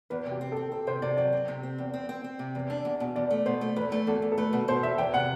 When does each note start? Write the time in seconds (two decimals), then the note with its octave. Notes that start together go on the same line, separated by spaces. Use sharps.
0.10 E2 B4
0.26 C3
0.31 G4
0.41 C4
0.52 A4
0.57 C4
0.72 C4 A4
0.87 C3 C5
1.02 C3 D5
1.17 F#3 D5
1.33 C4
1.48 C3
1.63 C4
1.78 E2
1.94 C4
2.09 C4
2.24 C4
2.39 C3
2.55 E2
2.70 D4
2.85 E2
3.00 B2
3.16 E2 D5
3.31 A3
3.46 B2 C5
3.61 A3
3.76 E2 B4
3.92 A3
4.07 E2 A4
4.22 E2
4.32 A4
4.38 A3 B4
4.53 B2 B4
4.68 B2 C5
4.83 E2 E5
4.98 E2 G5
5.14 C3 F#5